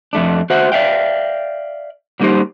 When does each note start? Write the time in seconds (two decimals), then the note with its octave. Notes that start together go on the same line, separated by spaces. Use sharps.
0.13 F2 A3 D4
0.50 F#4 C5 E5 F#5
0.72 D5 E5 F5 G5
2.20 F#3 G3 A#3 D#4 G4 C5